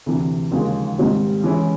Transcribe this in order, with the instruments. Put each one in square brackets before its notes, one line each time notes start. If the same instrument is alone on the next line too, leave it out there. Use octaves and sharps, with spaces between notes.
[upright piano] D2 C3 E3
D#2 C#3 F3 G#3
G#2 D#3 G3 C4
E3 G#3 C#4 E4